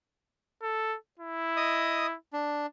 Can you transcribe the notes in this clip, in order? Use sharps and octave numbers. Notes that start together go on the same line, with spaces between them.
A4
E4
D#5 D#6
D4